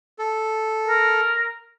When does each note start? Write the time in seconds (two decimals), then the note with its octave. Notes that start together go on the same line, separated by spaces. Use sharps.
0.19 A4
0.88 A#4